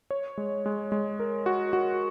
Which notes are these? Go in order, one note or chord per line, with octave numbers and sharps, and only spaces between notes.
C#5
G#3
G#3
G#3
A#4
F#4
F#4